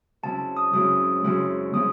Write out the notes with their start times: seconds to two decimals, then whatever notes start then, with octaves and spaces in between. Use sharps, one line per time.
0.23 F#2 C#3 G#3 C4 E4 A5
0.57 D#6
0.73 F#2 C#3 G#3 C4 E4 D#6
1.24 F#2 C#3 G#3 C4 E4
1.74 C#3 G#3 C4 E4 D#6